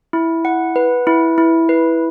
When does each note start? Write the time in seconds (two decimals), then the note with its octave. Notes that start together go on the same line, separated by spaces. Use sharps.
0.13 E4
0.45 F#5
0.76 B4
1.07 E4
1.38 E4
1.69 B4